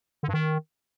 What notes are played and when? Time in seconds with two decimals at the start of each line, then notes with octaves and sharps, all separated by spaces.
0.23 D3
0.28 G2
0.33 D#3